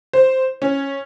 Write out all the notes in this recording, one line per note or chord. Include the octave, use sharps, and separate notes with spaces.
C5
C#4